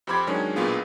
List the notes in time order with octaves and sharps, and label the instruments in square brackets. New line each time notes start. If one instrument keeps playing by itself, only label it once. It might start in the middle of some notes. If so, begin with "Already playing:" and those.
[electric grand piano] F2 G4 C5 B5 D6 G#6
C3 D#3 F#3 G#3 C#4 D4
B1 G2 A#2 B3 F4 G#4